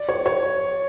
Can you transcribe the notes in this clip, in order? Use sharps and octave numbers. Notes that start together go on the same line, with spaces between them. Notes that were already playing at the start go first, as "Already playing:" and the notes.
Already playing: D5
C#5
C#5